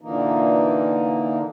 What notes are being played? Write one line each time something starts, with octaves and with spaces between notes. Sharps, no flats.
A#2 D3 E3 A#3 D#4